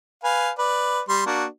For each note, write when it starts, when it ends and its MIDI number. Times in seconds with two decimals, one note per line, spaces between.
0.24 0.50 71
0.24 0.50 77
0.24 0.50 80
0.59 1.01 71
0.59 1.01 74
1.09 1.23 55
1.09 1.23 84
1.26 1.45 58
1.26 1.45 62
1.26 1.45 66